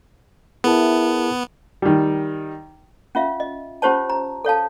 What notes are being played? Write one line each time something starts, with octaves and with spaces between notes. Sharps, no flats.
B3 E4 G#4 A#4 A5
D#3 G3
C#4 F4 E5 F5
D#5
C#4 F4 G4 C5 C#5 A5
A#5
A4 C#5 F5 A5